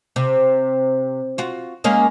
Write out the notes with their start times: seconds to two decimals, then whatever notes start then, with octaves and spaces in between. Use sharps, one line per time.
0.16 C3
1.38 F4 F#4
1.84 G#3 A#3 C#4